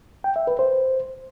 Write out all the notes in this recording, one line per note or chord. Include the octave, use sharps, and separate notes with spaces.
G5
E5
B4
C5